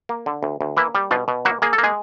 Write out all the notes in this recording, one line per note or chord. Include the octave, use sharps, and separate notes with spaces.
A#3
D3
D2
D2
E3 A#3 E4
G3
B2 F3 F4
B2
F#3 A#3 F#4
A#3 G#4
A4
A#3
G#3 G#4